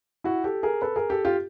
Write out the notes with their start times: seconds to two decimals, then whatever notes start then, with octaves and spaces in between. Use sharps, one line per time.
0.24 E4 F#4
0.44 G4 A4
0.63 G#4 A#4
0.82 A4 B4
0.96 G#4 A#4
1.10 G4 A4
1.25 F4 G4